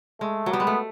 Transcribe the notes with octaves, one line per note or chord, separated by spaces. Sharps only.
G#3 A3
F#3
G3 B3
G#3
A3